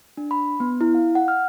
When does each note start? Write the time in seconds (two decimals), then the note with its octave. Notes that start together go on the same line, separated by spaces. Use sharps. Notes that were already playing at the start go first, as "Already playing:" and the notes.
0.17 D4
0.31 B5
0.60 B3
0.81 E4
0.95 F5
1.15 F#5
1.28 F6